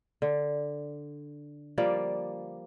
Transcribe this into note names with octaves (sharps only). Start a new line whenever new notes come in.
D3
F3 G3 A#3 D5